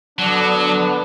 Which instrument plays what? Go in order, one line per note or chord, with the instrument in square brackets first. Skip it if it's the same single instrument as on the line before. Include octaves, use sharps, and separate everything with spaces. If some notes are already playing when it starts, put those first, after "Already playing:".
[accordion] D3 B3 D4 [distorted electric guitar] F#3